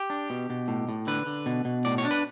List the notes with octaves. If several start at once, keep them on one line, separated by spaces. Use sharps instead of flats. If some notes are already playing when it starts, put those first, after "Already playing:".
Already playing: G4
D4
B2
B2
A2
A2
D3 B4
D3
B2
B2
A2 D5
C#5
D4
B4